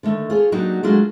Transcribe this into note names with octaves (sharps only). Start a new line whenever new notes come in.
D3 D#3 A3
F4 G#4 C#5
F#3 A#3 D4 D#4 F#4 G4
F#3 G#3 A3 D4 F4 F#4